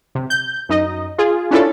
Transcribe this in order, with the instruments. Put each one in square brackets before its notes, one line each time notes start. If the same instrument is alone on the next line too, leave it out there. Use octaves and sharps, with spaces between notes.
[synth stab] C3
G6
F#2 D#4 D#5
F4 G#4
C#4 D4 E4 F4 A4